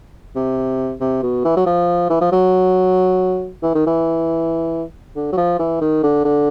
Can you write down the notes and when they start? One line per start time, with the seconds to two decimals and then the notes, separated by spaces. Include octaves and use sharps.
0.35 C3
1.00 C3
1.23 B2
1.44 E3
1.57 F#3
1.66 F3
2.10 E3
2.21 F3
2.32 F#3
3.62 E3
3.74 D#3
3.87 E3
5.16 D3
5.32 F#3
5.37 F3
5.59 E3
5.81 D#3
6.03 D3
6.25 D3